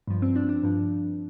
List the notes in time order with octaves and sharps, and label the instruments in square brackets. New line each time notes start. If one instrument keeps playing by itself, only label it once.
[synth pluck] G2 F3
C4
D4
D4
G2 F3